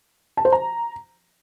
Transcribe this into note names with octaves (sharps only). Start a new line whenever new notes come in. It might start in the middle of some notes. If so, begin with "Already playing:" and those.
A5
C5
A#5